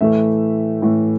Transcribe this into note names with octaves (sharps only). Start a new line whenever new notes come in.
A2 E3 A3 E5
A2 E3 A3